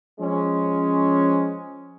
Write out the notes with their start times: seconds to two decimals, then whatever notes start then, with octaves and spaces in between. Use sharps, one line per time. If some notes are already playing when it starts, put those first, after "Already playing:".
0.21 F3 G#3 C#4